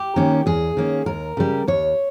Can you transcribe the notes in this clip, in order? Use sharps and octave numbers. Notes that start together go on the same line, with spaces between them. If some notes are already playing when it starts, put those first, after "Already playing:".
Already playing: G4
D#3 A#3 C#4
E2 G#4
D#3 A#3 C#4
D#2 A#4
C#3 G3
D#2 C#5